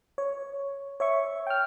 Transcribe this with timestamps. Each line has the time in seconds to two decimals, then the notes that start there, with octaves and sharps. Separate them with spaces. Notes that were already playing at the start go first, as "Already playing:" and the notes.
0.18 C#5
1.00 C#5 E5 C#6
1.47 G5 F6